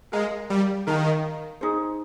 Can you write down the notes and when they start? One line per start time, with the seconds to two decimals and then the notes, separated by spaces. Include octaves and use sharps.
0.12 G#3 A#4 F5 A#5
0.50 G3
0.87 D#3 A#4 F5 A#5
1.61 D#4 G#4 C5